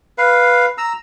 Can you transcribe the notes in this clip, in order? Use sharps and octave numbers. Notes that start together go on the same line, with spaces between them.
B4 F5
A#5 E6